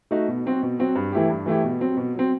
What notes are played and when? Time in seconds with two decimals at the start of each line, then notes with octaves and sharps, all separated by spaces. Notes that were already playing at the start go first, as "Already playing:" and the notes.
0.11 A3 D#4 F#4
0.28 B2
0.45 F#3 C4 F#4
0.62 B2
0.79 F#3 C4 F#4
0.95 G2
1.12 E3 A3 E4 G4
1.29 G2
1.46 E3 A3 E4 G4
1.63 B2
1.80 F#3 C4
1.97 B2
2.14 F#3 C4